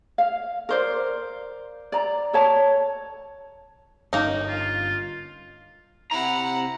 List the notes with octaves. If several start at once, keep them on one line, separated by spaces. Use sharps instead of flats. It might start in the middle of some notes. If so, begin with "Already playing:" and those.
F5
A#4 C5 D5
D5 A#5
A4 C#5 A5
G1 G2 A#3 C#4 D#4
F4
C3 E4 F#5 A#5